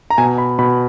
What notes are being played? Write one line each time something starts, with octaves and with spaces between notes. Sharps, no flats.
A#5
B2 G#5
B5
B2 B5